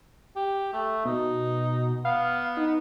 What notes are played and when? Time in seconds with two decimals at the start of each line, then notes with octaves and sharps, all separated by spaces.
0.36 G4
0.73 A3
1.05 B2 D#4
2.05 B3 F5
2.57 D#4